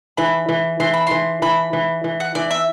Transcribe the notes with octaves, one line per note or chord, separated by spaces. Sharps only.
E3 B5
E3
E3 C6
B5
E3 C6
E3 B5
E3
E3
F#5
E3 D5
E5